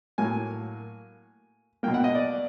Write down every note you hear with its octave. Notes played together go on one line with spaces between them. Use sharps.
A2 F#3 A#3 G#5
B2 F#3 A#3 G5
F#5
D#5
D5